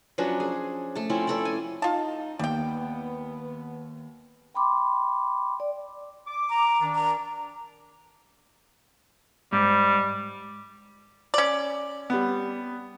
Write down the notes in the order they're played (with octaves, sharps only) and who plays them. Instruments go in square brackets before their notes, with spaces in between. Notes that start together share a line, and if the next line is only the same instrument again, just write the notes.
[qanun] F3 F#3 C#4 D4
G#4
A3 A5
F3 C4 C#4 E4
C#4 A4 D5
G#5
[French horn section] D#4 [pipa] F4 A5
[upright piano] D#2 [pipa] G3 G5 [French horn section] B3
[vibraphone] G5 B5 C6 D6
D5
[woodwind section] D6
[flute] A#5
[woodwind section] D#3 D4
[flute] A#5
[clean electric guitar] G#2 [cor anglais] G3
[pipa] C#4 D5
[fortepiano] G3 B3